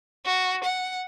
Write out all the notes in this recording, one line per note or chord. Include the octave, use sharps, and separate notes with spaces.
F#4
F#5